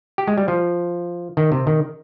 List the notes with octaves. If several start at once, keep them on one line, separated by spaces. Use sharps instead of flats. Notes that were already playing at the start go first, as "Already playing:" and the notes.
G4
G#3
G3
F3
D#3
C3
D#3